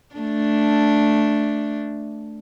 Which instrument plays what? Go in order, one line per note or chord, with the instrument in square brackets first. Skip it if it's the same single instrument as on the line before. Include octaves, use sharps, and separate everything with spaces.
[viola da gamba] A3 D4